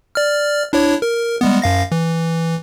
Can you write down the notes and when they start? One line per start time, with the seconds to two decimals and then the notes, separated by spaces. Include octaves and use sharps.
0.15 D5 F6
0.73 D4 E4 C#5
1.02 A#4
1.41 G3 G#3 B3
1.62 F#2 F5 A#6
1.92 E3